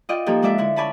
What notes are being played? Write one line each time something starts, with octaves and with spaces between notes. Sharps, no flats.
F4 D5 D#5 G5
F3 A#3 D#4 G4 A4 A#4
G#3 D4 A4 D5 E5
D3 E4
C#4 D5 G#5 A5 B5